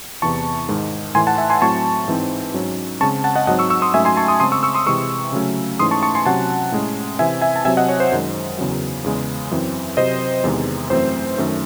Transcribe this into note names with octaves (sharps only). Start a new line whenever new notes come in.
E2 C3 E3 A5 C#6
G#2 D#3 G#3
A2 E3 A3 G#5 C6
F#5 A5
E5 G#5
G#5 C6
A2 F#3 C4 A5 C#6
G#2 E3 C4
G#2 F#3 C#4
C#3 G#3 C4 A5 C#6
F#5 A5
D#5 F#5
G#2 F#3 C4 D#5 F#5
C#6 E6
C#6 E6
C6 D#6
G#2 F#3 A3 C#4 E5 G#5
G#5 C6
A5 C#6
C6 D#6
C#3 G#3 C4 C6 D#6
C#6 E6
C#6 E6
C6 D#6
C3 E3 G#3 C#6 E6
C#3 F#3 A3 C#4
G#2 E3 A3 C#4 C6 D#6
A5 C#6
A5 C#6
G#5 C6
C3 F#3 C#4 F#5 A5
A2 G#3 C#4
C3 E3 C4 E5 G#5
E5 G#5
A5
C3 F#3 C4 E5 G#5
D#5 F#5
C#5
C5
F#2 D#3 G#3
E2 C#3 F#3
E2 C#3 G#3
F#2 E3 C4
C3 F#3 C4 C5 D#5
E2 C3 D#3 G#3
F#2 E3 A3 C4 C5
F#2 D#3 A3 C#4